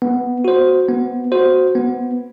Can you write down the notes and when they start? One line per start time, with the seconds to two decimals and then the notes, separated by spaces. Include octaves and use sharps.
0.02 B3
0.45 F#4 C5
0.89 B3
1.32 F#4 C5
1.75 B3